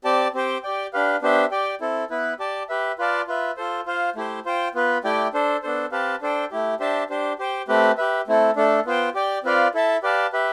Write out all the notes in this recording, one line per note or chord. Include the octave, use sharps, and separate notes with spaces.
C4 G4 D5 A5
C4 G4 C5 G5
G4 D5 G5
D4 G4 B4 F5
B3 D4 G4 C5 E5
G4 D5 G5
C4 E4 A4
B3 E4 B4
G4 D5 A5
G4 B4 E5
F4 B4 D5 F5 A5
F4 B4 E5
F4 A4 C5
F4 C5 F5
A3 E4 G4 C5
F4 C5 G5
B3 F4 B4
A3 E4 G4 D5 G5
D4 A4 C5
B3 D4 A4 C5
C4 G4 B4 F5 A5
D4 A4 C5 G5
A3 E4 G4
D4 G4 C5 E5 A5
D4 G4 C5
G4 C5 G5
A3 C4 G4 B4
G4 B4 E5
A3 C4 E4 A4
A3 D4 A4
B3 F4 C5 G5
G4 D5 G5
C4 F4 B4 D5 F5
E4 A4 E5 A5
G4 B4 D5 F5 A5
G4 B4 E5